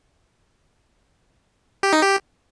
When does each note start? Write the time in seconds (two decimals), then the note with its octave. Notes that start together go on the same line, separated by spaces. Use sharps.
1.83 G4
1.93 D#4
2.02 G4